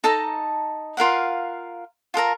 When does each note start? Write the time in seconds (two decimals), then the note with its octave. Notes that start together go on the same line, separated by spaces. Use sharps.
0.04 D#4 A4 A5 A#5
0.97 F4 A#4 F5 F#5
2.14 F4 A4 A#4 A#5